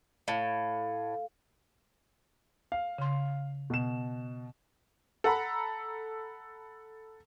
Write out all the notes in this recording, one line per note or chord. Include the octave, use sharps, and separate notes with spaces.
A2 F5
F5
C#3 C6
B2 E7
A4 F#5 A#5 B5